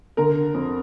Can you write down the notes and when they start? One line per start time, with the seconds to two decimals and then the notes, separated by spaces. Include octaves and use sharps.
0.17 D3 A#4
0.54 F2